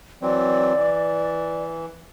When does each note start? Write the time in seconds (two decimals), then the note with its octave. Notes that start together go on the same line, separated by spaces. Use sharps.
0.22 E3 F#3 C4 D5
0.76 E3